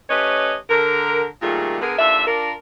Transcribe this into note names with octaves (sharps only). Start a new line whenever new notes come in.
A3 C#4 G4 B4 C#5 D#5
D3 A#4
A#2 D#3 G3 A3 F4 G#4
D3 B3 G#4 A#4
D#2 D4 F4 A4 E5
D4 F4 A#4